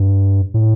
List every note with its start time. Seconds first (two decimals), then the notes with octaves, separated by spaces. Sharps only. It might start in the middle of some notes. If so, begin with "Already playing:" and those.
Already playing: G2
0.54 A2